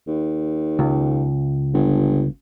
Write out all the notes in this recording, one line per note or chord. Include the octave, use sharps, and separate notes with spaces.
D#2
C#2
G1